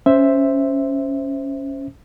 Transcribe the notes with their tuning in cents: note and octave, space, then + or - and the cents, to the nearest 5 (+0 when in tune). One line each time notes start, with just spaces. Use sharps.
C#4 +0 C5 +0 E5 +0